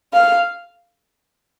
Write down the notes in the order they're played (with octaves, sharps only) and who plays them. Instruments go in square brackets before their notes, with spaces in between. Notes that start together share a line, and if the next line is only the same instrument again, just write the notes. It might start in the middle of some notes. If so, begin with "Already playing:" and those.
[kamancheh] F5